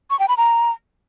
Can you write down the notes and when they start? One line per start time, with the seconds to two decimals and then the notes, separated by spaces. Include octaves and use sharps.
0.10 C#6
0.19 G5
0.28 B5
0.37 A#5